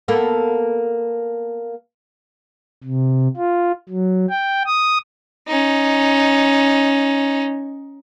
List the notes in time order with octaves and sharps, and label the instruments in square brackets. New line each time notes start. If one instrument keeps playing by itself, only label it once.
[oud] A#3 B3 A4
[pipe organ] C3
F4
F#3
G5
D#6
[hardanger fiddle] C#4 D#4